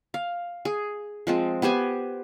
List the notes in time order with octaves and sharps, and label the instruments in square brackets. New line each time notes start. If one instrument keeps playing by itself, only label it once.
[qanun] F5
G#4
F3 G#3 C4
B3 G4 C5 G#5